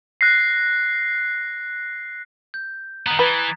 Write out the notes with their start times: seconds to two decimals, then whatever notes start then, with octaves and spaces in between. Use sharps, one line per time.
0.21 F#6 A#6 C7
2.54 G6
3.07 D#3 B3 A#5 D#6 F#6
3.19 E3 B4 G#6 A6 B6